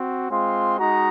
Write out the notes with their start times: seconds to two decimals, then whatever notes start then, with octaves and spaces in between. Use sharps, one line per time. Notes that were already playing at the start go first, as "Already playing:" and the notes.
Already playing: C4 F#4
0.30 G#3 C4 F4 C6
0.78 G#3 D#4 F#4 A#5